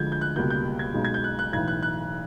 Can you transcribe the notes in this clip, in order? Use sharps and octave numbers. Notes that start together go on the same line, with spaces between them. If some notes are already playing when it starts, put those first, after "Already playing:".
Already playing: D2 D3 F3 G#3 G6 G#6
G6
F#6
C#2 B2 G3 A#3 G6
G6
G#6
B1 B2 G#3
G#6
G6
F#6
F#6
B1 A2 E3 G#6
F#6
F#6